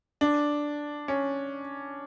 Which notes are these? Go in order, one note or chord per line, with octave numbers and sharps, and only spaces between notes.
D4
C#4